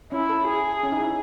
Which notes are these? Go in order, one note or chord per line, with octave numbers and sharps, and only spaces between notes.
C#4 E4
A4
G#4
C#4
D#4
E4